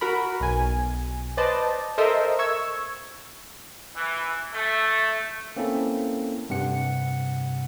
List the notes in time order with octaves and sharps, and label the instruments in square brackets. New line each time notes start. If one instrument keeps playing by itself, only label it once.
[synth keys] F#4 A#4 B5
B1 G#5
B4 C5 D5 D#5 A5
A4 A#4 C5 D#5 E5
C#6 E6 G#6
[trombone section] E3
A3
[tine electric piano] A#3 C4 C#4 E4 A4
G2 C3 F#5 C#7